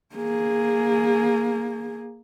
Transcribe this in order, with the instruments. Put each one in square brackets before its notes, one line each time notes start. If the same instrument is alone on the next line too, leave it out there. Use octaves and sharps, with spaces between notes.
[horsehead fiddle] A#3 G#4